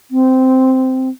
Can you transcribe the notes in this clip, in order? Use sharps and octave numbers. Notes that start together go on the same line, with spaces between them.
C4